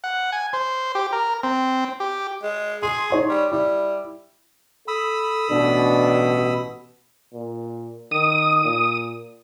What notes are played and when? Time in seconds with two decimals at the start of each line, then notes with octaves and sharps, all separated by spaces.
0.04 F#5
0.32 G#5
0.53 C5
0.95 G4
1.12 A#4
1.43 C4
2.00 G4
2.43 G#3
2.83 G#4 C6
3.10 D#4 C#5 C6
3.29 G3
3.52 G3 E4
4.88 A4 B5 D#6 E6
5.50 A1 B2 D4
7.33 A#2
8.11 D#3 D#6
8.65 A#2